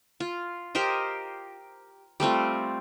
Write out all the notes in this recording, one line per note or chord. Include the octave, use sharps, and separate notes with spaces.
F4
G4 A#4 C5 D#5
G3 A3 C4 F4